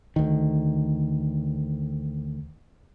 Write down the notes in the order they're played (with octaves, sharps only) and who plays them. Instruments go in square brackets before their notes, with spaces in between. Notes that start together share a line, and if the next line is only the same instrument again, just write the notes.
[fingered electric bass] D2 D#3